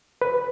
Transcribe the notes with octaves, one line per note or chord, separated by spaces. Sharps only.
B4